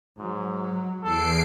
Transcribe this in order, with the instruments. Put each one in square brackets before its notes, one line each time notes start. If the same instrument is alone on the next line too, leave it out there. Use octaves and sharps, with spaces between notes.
[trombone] G#2 [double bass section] F#3
[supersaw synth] E2 C7 D7 [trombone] A4